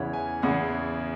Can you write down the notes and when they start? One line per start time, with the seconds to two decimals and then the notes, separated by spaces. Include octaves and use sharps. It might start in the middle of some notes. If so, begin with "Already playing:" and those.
Already playing: E2 C#3 E3 C#5 E5 F#5
0.13 G#5
0.42 E2 C#3 E3 F#5